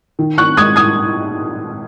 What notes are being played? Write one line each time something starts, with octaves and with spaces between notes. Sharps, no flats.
D#3
C#6 F#6
G#3 D#6 G#6
D#6 G#6